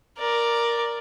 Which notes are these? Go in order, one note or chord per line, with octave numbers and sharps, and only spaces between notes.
A#4 D5